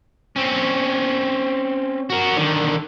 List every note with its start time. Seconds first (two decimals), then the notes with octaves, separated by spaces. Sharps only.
0.36 C4 C#4
2.10 F#4 A#4
2.36 D3 D#3